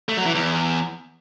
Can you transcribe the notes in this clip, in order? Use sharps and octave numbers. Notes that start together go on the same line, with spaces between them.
A3
F#3
E3
E2